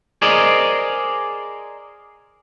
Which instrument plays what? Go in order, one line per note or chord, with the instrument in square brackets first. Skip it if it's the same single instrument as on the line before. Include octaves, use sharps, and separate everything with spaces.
[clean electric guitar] G#4 A#4 C5 D5 D#5